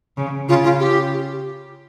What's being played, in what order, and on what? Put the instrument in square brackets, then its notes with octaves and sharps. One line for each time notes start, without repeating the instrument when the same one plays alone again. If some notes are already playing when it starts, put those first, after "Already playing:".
[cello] C#3
[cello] C#3 [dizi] F4
[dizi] F4
G4